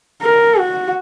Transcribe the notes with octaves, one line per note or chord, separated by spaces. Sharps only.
A#4
F#4